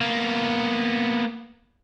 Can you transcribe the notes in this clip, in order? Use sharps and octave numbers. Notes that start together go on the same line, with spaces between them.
A#3 B3